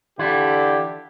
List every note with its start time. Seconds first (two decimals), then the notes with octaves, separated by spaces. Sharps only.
0.19 D3 E3 E4 F4 G4